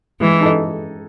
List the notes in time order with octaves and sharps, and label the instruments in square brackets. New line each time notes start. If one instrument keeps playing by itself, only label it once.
[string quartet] E3 [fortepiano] G#3
[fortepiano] D#4 A4 D#5